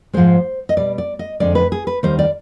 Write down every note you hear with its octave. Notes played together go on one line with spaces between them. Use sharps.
G#2 F3 G#3 C5
D#5
B2 G3 D5
D5
D#5
F2 D3 G#3 D5
B4
G#4
B4
D#2 D#3 G3 C5
D5